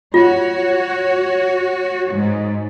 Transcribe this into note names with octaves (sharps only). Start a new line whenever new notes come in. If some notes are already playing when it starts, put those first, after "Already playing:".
F4 F#4 C#5
G#2